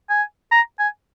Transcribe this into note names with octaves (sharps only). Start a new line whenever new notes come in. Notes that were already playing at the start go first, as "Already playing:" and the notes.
G#5
A#5
G#5